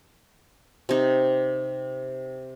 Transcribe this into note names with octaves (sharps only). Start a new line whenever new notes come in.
C3 D#4